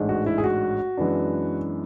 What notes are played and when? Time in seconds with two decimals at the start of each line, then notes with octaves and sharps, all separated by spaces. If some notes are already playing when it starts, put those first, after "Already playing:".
Already playing: A1 G#2 G#3 D4
0.09 F#4
0.26 E4
0.38 G#4
0.44 F#4
0.97 F#2 E3 G#3 B3 D4